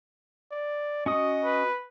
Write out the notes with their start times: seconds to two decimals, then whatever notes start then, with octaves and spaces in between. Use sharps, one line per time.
0.51 D5
1.06 C#4 F#4 D#5 D#6
1.44 B4